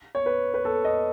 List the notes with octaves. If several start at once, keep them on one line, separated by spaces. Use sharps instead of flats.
C#5
B4
B4
A4
D#5